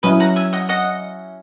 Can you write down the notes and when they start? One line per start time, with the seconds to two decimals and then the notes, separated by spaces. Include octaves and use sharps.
0.03 F#3 C#4 E4 B4 D#5
0.20 F#5 A#5
0.36 E5 G#5
0.53 D#5 F#5
0.69 D#5 F#5